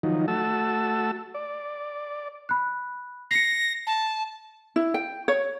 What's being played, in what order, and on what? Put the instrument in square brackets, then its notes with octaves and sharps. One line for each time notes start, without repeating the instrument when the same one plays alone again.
[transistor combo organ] D#3 F3 F#3 D#4
A3 F#4 A5 E6
D5
[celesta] B5 F#6
[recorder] A#6 [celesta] C7 C#7
[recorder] A5
[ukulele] E4
G5
C#5